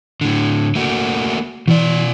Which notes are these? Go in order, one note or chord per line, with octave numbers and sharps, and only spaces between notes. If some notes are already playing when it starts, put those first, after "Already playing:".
A2 D3
A3 A#3 F#4
B2 E3 D5